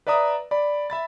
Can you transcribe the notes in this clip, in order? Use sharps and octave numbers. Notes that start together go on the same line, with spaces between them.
B4 D5 E5 A#5 D#6
D5 B5
E5 B5 A6